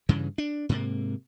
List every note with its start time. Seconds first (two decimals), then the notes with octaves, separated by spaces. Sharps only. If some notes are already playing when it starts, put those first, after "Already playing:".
0.09 G2 C#3 E3
0.38 D4
0.69 G#2 C3 A#3